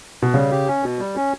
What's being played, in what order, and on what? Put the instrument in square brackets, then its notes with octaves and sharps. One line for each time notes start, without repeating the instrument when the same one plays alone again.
[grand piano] B2
[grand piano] C#3 [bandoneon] G3
[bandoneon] G4
C#4
B2
G3
C#4